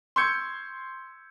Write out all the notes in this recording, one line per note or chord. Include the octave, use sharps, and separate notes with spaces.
C6 C#6 E6 G6 G#6 C#7